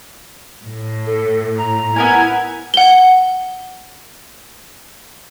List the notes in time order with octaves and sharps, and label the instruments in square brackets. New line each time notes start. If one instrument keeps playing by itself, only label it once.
[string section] A2
[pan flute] A4
A#5
[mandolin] B3 A#4 G#5 [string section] E4 G#6
[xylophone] F#5 G7